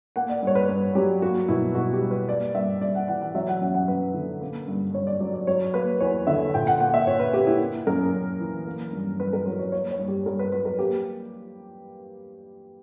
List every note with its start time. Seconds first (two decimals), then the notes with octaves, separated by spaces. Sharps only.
0.16 A#3 F#5
0.29 D5
0.42 G2 C#5
0.55 B4
0.69 G2 B4
0.95 F#3 G4
1.22 A#3 F#4
1.49 B2 E4
1.75 B2 F#4
1.93 G4
2.02 G3
2.11 B4
2.29 A#3 D5
2.55 G2 E5
2.81 G2 D5
2.95 F#5
3.08 E3 F#5
3.21 F#5
3.34 F#3 E5
3.48 F#5
3.61 F#2 F#5
3.74 F#5
3.88 F#2 B4
4.14 D3
4.41 A#3
4.68 G2
4.94 G2 C#5
5.07 D5
5.20 F#3 D5
5.34 D5
5.47 F#3 C#5
5.74 A#3 B4
6.00 E2 C#5
6.27 D3 E5
6.54 A#2 G5
6.67 F#5
6.80 A#3 F#5
6.94 E5
7.07 A#2 C#5
7.20 B4
7.33 A#3 G4
7.47 E4
7.60 A#3
7.87 F#2 A#4
8.13 F#2
8.40 E3
8.67 A#3
8.93 G2
9.20 G2 B4
9.33 A#4
9.46 F#3 B4
9.59 C#5
9.72 A#3 C#5
9.91 C#5
9.99 G2
10.08 G4
10.26 G2 A#4
10.39 B4
10.52 F#3 B4
10.65 A#4
10.79 A#3 G4